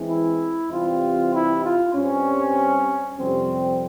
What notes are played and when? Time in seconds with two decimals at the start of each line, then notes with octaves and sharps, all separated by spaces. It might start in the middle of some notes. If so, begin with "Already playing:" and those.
Already playing: E2 E3 G#3 C4
0.09 E4
0.70 E2 C3 G3 C4 F4
1.33 E4
1.64 F4
1.94 G2 G3 C4 C#4
3.18 F2 C3 G3 C4